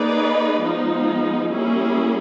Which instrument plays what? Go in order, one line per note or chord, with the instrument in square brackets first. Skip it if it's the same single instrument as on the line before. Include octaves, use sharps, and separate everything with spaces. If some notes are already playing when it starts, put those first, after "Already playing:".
Already playing: [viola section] A#3 D#4 G#4 B4 D5
F3 G#3 B3 D#4
G3 A#3 C#4 E4 G#4